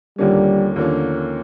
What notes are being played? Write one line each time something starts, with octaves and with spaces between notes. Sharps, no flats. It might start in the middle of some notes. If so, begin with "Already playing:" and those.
D#2 D3 F3 G3 A#3 C#4
D#2 D3 F3 A#3 C#4